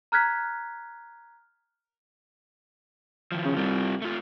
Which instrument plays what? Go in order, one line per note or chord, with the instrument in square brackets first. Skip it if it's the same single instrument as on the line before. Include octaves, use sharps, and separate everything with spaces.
[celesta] A#5 F6 F#6 G#6 B6
[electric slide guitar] D#3 F3
[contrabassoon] C#3
[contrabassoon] C2 [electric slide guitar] F4 G4
[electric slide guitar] A3 F4